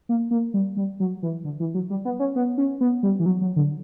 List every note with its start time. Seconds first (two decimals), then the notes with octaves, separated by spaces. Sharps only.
0.09 A#3
0.31 A#3
0.54 G3
0.77 G3
1.00 F#3
1.23 E3
1.45 D3
1.60 E3
1.74 F#3
1.90 G3
2.05 B3
2.19 C#4
2.36 B3
2.58 C#4
2.81 B3
3.03 G3
3.20 E3
3.26 F#3
3.41 F#3
3.56 D3